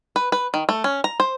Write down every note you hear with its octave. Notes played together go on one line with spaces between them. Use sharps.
B4
B4
D#3
A3
C#4
A#5
C5